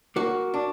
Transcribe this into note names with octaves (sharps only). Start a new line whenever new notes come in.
A#3 F#4
D4